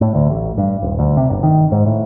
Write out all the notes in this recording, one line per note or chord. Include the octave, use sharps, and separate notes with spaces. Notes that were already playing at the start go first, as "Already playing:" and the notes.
A2
D2
A1
G2
D#1
D2
C3
G1
D#3
G#2
A2